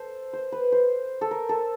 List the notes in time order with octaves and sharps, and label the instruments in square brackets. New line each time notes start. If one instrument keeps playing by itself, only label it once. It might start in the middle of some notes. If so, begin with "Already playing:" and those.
Already playing: [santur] A4 C5
C5
B4
C5
A4
A#4
A4